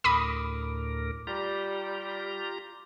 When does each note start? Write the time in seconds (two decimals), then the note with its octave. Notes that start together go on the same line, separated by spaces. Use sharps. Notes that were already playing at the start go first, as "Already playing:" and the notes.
0.04 D2 A2 A#4 B5 D6 D#6
1.27 G3 F4 G4 A#5